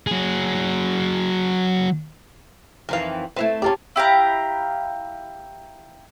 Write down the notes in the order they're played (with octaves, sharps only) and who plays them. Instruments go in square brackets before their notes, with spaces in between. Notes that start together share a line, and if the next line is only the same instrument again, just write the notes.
[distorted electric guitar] F#3 G#4
[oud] F2 D#3 E3 [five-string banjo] A#4 F5
[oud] A3 E4 B4 [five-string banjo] C4
[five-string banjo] C#4 F4 D5 [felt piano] G4 A5
[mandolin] E4 G4 F5 A#5